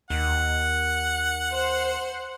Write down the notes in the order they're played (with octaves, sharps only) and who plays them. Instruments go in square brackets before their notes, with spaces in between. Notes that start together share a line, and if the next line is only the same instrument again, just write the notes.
[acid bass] D#2 [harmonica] F#5
[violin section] C5